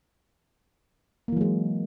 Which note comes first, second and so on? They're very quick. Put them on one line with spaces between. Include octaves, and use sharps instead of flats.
A#3 E3 F#3 G#3